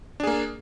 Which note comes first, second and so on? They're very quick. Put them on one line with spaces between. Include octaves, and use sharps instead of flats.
D4 G#4 A#3